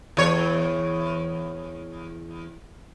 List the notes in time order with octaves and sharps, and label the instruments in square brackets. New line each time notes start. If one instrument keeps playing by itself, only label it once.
[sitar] E2 C#5